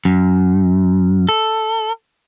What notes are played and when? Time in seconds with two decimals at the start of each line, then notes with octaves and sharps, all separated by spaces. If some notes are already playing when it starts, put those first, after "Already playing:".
0.05 F#2
1.29 A4